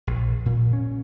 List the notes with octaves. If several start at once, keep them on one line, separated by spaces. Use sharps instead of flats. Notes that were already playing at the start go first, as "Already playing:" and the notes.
A#1
A#2
C#4